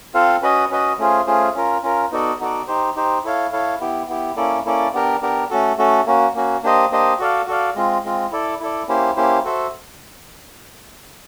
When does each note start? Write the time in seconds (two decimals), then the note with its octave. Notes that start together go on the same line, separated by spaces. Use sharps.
0.14 C4 F4 A4 C5 F5
0.42 C#4 F#4 B4 D#5
0.70 C#4 F#4 B4 D#5
0.99 A3 C#4 F4 G#4 C5
1.26 A3 C#4 F4 G#4 C5
1.54 C#4 F4 A#4
1.83 C#4 F4 A#4
2.11 B3 D#4 F#4 A4 D5
2.40 B3 D#4 F#4 A4 D5
2.67 D#4 G4 C5
2.96 D#4 G4 C5
3.24 E4 A4 C#5 F5
3.52 E4 A4 C#5 F5
3.80 B3 E4 G4
4.09 B3 E4 G4
4.36 A#3 C#4 E4 A4 D5
4.65 A#3 C#4 E4 A4 D5
4.93 B3 D4 G4 A#4
5.22 B3 D4 G4 A#4
5.50 A3 C#4 F#4 A4
5.78 A3 C#4 F#4 A4
6.06 A#3 C#4 F#4
6.34 A#3 C#4 F#4
6.63 A#3 D4 G4 C5 D#5
6.91 A#3 D4 G4 C5 D#5
7.19 F#4 A4 D5 F5
7.47 F#4 A4 D5 F5
7.75 G#3 C4 F4
8.04 G#3 C4 F4
8.31 E4 A4 D5
8.60 E4 A4 D5
8.88 A#3 C#4 E4 G4 C5
9.16 A#3 C#4 E4 G4 C5
9.45 F#4 A4 C5 E5